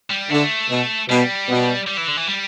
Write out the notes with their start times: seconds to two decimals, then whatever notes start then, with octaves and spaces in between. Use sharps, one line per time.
0.11 G3
0.30 D3 A3
0.70 B2
1.09 B2 G3
1.49 B2
1.88 G3
1.98 E3
2.08 D3
2.17 E3
2.28 G3